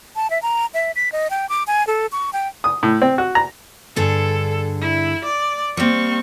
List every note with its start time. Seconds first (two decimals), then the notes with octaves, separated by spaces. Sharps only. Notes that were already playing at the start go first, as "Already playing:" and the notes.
0.16 A5
0.30 E5
0.42 A#5
0.74 E5
0.96 B6
1.12 D#5
1.30 G5
1.49 D6
1.67 G#5
1.87 A4
2.12 C#6
2.33 G5
2.64 D#6
2.83 A2
3.02 C4
3.18 F#4
3.35 A#5
3.96 G2 D3 G#4 A4
4.81 E4
5.25 D5
5.77 G3 A#3 C4 C#6